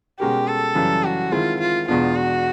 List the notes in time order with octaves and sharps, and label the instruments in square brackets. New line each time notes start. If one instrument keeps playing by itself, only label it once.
[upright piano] B2 G#3 C#4 F#4 A#4 [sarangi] G4
[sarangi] A4
[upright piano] F#2 C#3 E3 G3
[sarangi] F#4
[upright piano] D#3 G#3 C4 E4 G#4 [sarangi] F4
[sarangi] F4
[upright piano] E2 B2 G#3 B3 D4 [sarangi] F4
[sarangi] F#4